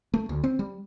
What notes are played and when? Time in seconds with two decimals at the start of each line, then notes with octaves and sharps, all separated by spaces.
0.14 A3
0.29 D2
0.44 C4
0.59 G3